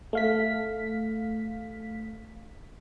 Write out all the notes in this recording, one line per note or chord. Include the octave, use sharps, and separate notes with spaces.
A3 F5 B6